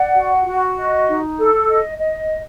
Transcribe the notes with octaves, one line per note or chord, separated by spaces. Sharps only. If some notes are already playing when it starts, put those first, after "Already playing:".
Already playing: D5 F#5
F#4
F#4
D#5
D#4
A4
D#5
D#5